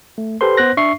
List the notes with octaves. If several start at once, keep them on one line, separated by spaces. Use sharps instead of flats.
A3
G4 A4 B4 C5 C6
B3 C5 F#6 A#6
D4 E5 C#6 C7